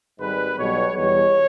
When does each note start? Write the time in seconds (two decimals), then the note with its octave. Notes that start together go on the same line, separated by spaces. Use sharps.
0.19 G#1 G#2 G3 B4
0.57 B1 B2 G3 C#5
0.95 E2 B2 G3 C#5